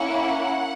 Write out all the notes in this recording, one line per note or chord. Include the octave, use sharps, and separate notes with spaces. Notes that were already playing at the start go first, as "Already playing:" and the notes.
Already playing: A#3 C#4 E4 F#5